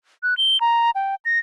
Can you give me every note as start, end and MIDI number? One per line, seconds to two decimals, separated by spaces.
0.23 0.37 90
0.38 0.60 103
0.61 0.91 82
0.95 1.15 79
1.25 1.39 94